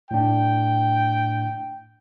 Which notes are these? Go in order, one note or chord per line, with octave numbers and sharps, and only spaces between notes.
A2 D4 G5